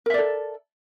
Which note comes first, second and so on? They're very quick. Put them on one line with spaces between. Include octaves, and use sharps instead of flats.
A#4 E5 D5 A4